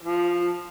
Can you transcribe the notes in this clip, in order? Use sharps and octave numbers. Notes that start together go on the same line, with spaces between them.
F3